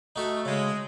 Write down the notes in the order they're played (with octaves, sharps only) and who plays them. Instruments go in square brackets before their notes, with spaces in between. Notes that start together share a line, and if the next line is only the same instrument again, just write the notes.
[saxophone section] A3 [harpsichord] D#4 F#4
[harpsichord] C#3 [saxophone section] G#3